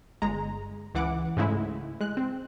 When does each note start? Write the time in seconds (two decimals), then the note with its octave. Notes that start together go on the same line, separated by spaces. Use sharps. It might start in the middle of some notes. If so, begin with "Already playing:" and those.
0.22 G1 G#3 A#5
0.95 C#2 E3 F#5 D6
1.37 G#2 C#3 G#3 A3 E4
2.00 G#3 F#6
2.17 C4